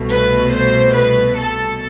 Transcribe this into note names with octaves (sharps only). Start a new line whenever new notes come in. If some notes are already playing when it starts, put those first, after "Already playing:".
Already playing: C2 B2 A3
B4
C5
B4
A4